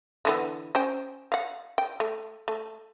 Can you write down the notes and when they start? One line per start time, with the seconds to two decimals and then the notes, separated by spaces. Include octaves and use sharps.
0.25 D3 E3 B3
0.75 C#4 C5 G5
1.32 F5 F#5
1.78 G5
2.00 A3
2.48 A3